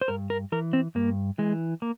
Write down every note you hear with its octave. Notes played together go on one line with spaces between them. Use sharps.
C5
G2 A#4
A#4
E3 A#4
C4
G2 A#3
E3 G#3
A#3